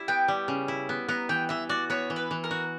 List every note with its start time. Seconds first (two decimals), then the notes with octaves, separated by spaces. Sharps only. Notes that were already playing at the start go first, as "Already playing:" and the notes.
Already playing: G3 E4
0.08 B3 G5
0.28 G3
0.48 C#3
0.68 E4
0.89 B3
1.08 B3 A#5
1.29 E3 G5
1.49 E3 E5
1.69 F#4 D5
1.90 B3 C#5
2.10 E3
2.16 B4
2.31 E3
2.44 A#4
2.51 F#4